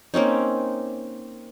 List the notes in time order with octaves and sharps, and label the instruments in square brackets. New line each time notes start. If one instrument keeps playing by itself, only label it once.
[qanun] A#3 C4 C#4 D#4